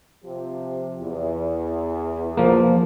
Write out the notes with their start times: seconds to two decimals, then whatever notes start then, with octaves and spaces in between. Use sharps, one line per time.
0.25 C3 F3 G4
0.99 E2
2.37 F3 A#3